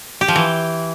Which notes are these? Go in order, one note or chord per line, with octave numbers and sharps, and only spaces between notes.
G4
F3
E3